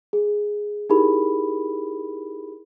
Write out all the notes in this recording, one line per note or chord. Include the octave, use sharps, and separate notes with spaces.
G#4
D#4 E4 G4 G#4 A#4 B5